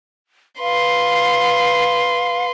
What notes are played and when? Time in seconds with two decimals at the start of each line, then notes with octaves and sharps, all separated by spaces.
0.60 B4 F5 C6